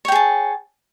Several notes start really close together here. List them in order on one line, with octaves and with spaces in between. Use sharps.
C#5 G5 G#4 A5